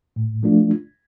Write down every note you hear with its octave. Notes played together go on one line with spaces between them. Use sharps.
A2
F3 A3 D4 F4